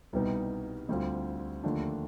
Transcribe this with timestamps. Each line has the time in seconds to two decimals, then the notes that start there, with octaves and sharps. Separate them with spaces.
0.13 C2 B2 G3 B3 D#4
0.89 D2 D3 G3 C4 F4
1.63 D#2 D3 F3 A3 D4